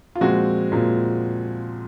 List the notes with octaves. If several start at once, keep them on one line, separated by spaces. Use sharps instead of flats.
F4
A#2 F3 G#3 C4 F#4
A#2 F3 G#3 C4